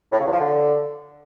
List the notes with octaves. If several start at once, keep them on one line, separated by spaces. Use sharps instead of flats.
A2
C#3
E2
F3
D3